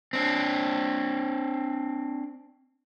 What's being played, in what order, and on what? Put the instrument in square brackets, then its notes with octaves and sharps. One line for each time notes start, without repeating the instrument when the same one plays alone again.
[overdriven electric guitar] C4 D4